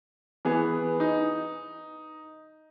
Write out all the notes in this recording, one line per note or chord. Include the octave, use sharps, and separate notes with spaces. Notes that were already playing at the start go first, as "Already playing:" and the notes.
E3 B3 G#4
D#4